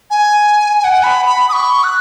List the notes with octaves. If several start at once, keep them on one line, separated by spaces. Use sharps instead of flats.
G#5
G#5
F#5
B5
B5
D#6
C#6
F#6